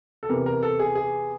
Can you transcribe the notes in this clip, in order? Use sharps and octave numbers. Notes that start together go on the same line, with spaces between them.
A4
E2 C3 E3 A#4
A#4
A4
G#4
G#4